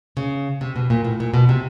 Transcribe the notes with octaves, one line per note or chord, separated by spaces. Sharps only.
C#3
C3
B2
A#2
A2
A#2
B2
C3